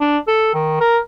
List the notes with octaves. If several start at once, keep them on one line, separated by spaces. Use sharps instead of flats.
D4
A4
D#3
A#4